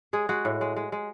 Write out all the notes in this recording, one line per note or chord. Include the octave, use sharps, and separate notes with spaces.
G#3 G#4
G#3 F#4
A2
G#3
G#3
G#3